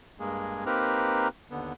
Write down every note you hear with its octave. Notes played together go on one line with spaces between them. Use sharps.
G2 G#3 A#3 G#4
A#3 C4 D#4 G4 A#4 B4
D#2 D3 B3